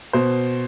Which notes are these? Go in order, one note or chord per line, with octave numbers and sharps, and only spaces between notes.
B2 C5